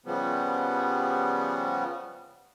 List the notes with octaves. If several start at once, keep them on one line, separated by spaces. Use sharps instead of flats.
C#3 F3 G3 B3